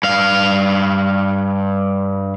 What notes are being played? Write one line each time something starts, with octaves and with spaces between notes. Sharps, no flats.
G2 F5